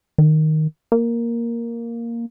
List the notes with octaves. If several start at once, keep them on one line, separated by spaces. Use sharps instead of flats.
D#3
A#3